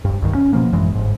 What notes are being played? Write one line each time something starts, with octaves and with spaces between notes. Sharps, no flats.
E1 G2
C2 G2 D#3
C#4
B2 F3 A#3
A1 F#2 E3 G#3
G1 G#2